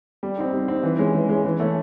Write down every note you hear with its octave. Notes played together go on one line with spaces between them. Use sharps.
G3
C4 D#4
G3
C4 D#4
E3
G#3 C#4
E3
G#3 C#4
E3
A3 C#4